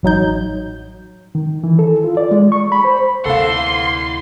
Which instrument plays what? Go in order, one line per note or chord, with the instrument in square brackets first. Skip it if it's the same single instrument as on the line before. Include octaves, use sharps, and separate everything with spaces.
[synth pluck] A1 F#3 D#4 G6
[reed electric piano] D#3
E3
A4
F4
D5
G#3
C#6
B5
C5
[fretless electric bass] D2 C3 C4 [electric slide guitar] E4 F#5 [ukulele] A4 F5 [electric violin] C6